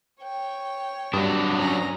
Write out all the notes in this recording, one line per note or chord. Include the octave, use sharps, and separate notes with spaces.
C#5 G5
G2 F#3 D4 D#6
C#4 A#5